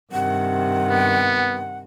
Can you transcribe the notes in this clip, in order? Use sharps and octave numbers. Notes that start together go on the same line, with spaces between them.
G2 C3 D#3 F#5
B3